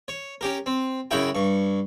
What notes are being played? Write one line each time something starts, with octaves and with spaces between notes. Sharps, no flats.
C#5
C#4 G4 A#4
C4
F#2 C#3 E4 F#4 G5
G2 C#6